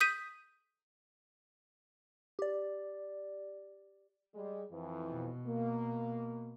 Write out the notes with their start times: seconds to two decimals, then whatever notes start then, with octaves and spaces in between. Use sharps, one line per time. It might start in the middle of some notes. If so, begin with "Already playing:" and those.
0.01 D#6 G6 B6 D#7
2.39 G4 D5
4.35 G3 G#3
4.71 F2 E3
5.09 B2
5.46 A#3